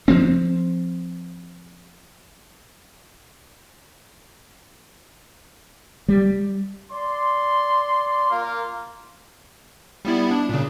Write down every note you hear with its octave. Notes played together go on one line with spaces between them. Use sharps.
F3 C4
G3
D5 C6
A#3 F4 A#4
G3 B3 E4
D4
A#2 C#3